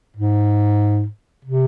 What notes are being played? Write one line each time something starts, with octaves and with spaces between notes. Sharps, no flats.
G#2
C3